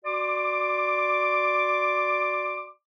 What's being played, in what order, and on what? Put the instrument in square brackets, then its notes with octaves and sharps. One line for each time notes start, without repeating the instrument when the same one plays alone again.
[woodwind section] F#4 D5 C6 D6